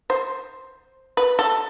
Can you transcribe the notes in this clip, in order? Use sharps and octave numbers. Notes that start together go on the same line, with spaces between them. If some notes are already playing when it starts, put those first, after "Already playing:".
C5
B4
A4